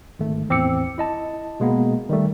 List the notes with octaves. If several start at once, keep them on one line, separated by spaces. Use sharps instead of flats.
G#1 A3
A1 E2 C4 D6 E6 C#7
E4 D#5 A5
B2 G#3 A#3 B3
D#3 G3 A3